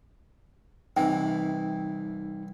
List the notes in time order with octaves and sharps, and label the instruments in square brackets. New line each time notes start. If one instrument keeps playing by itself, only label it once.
[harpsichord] C2 E3 [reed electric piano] D#4 [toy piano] G5